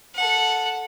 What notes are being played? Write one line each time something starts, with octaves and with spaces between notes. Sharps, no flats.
A4 F#5